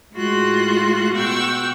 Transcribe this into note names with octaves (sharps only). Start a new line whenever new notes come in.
A2 G#3 F4 F#4 C6 F#6
B2 F#5 G5 C#6 E6